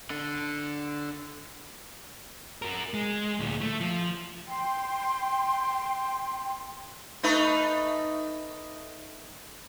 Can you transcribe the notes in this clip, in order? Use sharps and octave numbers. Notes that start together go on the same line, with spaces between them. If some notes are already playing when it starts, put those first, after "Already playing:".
D3
F#4 A#4
G#3
D2 A#2
A3
F3
G5 C6
A3 D#4 B4